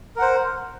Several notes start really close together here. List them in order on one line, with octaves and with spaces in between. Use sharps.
A#4 F#5 C5